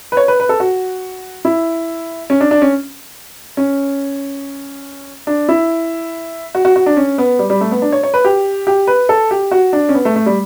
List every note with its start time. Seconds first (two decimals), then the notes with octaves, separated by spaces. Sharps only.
0.12 B4
0.17 C#5
0.28 B4
0.40 B4
0.49 A4
0.60 F#4
1.45 E4
2.30 C#4
2.41 D4
2.51 D4
2.62 C#4
3.57 C#4
5.27 D4
5.49 E4
6.55 F#4
6.65 F#4
6.76 F#4
6.86 D4
6.97 C#4
7.18 B3
7.39 G3
7.50 G3
7.61 A3
7.71 B3
7.82 D4
7.92 C#5
8.03 C#5
8.14 B4
8.25 G4
8.67 G4
8.87 B4
9.09 A4
9.31 G4
9.51 F#4
9.73 D4
9.89 C#4
9.95 B3
10.05 A3
10.16 A3
10.26 G3